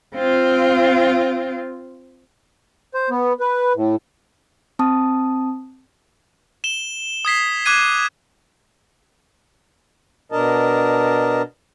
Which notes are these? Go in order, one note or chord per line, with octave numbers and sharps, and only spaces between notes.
C4 F4
C5
B3
B4
A2
C4 A5 D#6
E7 G7
D#6 G#6 B6 C7
D6 F#6 G#6 D#7
B2 D4 A#4 D#5 A5